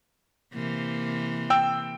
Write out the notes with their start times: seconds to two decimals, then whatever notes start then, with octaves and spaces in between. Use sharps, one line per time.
0.53 C3 E3 A#3
1.50 G5 E6